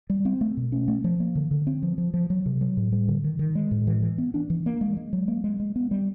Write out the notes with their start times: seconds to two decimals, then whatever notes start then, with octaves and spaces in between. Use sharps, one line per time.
0.10 G3
0.25 C4
0.41 A3
0.57 B2
0.72 C#4
0.88 A3
1.04 F3
1.20 A#3
1.35 D3
1.51 D3
1.67 C4
1.83 F3
1.98 F3
2.14 F3
2.30 F#3
2.46 C3
2.61 F#3
2.77 A2
2.92 G3
3.08 D3
3.24 D#3
3.39 D#3
3.55 G#3
3.71 A2
3.87 E3
4.02 E3
4.18 B3
4.34 D4
4.50 E3
4.66 A#3
4.81 G#3
4.97 G#3
5.13 F#3
5.28 A#3
5.44 G#3
5.60 G#3
5.76 B3
5.91 G3